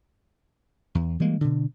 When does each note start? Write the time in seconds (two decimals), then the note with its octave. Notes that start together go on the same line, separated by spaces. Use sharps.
0.95 E2
1.20 E3 G3 G#3 A#3
1.41 B2 D3